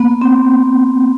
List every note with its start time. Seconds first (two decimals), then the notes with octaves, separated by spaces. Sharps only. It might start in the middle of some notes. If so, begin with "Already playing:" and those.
Already playing: A#3 B3
0.21 C4